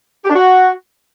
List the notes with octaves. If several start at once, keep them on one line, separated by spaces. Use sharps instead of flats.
G4
D4
F#4